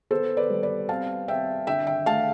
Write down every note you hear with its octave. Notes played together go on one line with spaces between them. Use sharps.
B3 A4 C5
B4 D5
G3
B4 D5
C4 F5 A5
C4 E5 G5
D3 E5 G5
E5 G5
A3 F5 A5